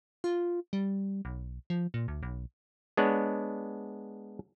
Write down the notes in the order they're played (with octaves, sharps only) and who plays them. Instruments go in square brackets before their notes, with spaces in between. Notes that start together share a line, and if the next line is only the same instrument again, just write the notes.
[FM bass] F4
G3
B1
F3
A#2
D2
B1
[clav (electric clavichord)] G#3 B3 D4 C#5 F#5